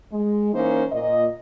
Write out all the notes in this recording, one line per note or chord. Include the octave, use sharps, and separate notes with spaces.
G#3
E3 A#3 C#4 D#4 A#4 C5
A#2 D#5